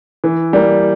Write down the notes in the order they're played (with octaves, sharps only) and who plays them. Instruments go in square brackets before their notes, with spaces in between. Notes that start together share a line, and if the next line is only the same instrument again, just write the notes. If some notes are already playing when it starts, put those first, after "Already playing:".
[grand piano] E3
G3 A#3